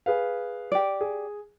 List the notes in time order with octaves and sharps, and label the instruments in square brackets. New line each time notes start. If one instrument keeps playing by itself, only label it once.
[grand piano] G#4 B4 F5
[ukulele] G4 D5
[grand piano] G#4